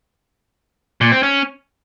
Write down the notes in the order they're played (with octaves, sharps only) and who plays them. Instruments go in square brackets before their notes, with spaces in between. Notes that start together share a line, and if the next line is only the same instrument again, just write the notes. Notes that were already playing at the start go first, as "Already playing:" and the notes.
[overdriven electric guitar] A#2
C4
C#4